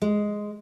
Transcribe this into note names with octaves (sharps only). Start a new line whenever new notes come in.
G#3